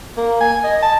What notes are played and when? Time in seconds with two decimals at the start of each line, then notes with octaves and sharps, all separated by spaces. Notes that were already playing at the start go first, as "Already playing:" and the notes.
0.17 A#3
0.41 G#5
0.64 D#5
0.82 A5